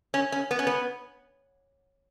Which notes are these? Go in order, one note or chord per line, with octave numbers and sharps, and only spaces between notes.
C#4
C#4
B3
C#4
B3